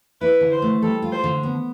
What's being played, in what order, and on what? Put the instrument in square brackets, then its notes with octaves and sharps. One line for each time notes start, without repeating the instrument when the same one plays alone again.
[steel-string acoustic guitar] E4 [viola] B4
[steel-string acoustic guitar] D3
[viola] C5
[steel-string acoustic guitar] A3
[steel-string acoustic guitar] G3 [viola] A4
[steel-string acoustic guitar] F4
[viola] C5
[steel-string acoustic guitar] D3
B3